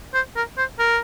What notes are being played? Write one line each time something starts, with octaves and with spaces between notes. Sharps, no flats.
C5
A#4
C5
A#4